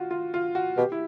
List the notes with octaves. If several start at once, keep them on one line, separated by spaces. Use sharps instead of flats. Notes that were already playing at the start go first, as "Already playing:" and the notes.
Already playing: F4 F#4
F4
F4
F#4
B2 G4
E4